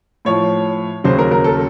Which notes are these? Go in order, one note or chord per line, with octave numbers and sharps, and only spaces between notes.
A2 F3 C#5
D#2 C#3 F#3 C5
A#4
A#4
A4